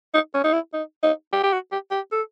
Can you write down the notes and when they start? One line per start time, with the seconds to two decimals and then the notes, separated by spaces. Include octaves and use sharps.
0.14 D#4
0.34 C#4
0.44 D#4
0.53 E4
0.74 D#4
1.03 D#4
1.33 G4
1.43 G4
1.53 F#4
1.72 G4
1.91 G4
2.12 A4